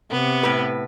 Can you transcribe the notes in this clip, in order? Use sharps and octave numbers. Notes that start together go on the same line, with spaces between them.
C3 B3
A2 B4